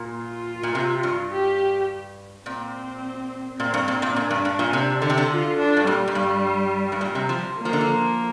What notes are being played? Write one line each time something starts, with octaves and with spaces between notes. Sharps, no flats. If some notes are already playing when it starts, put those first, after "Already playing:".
Already playing: A#2
F4
A#2
C3
G2
G4
A#2 C4
A#2 C4
G2
A#2 C4
A#2
A#2 D4
G2
G2
A#2
C3
D3
C3
D3
F4
D4
G2
A#2 G3
A#2
G2
G2
A#2
C3
F3
A#3
F3
D3
F3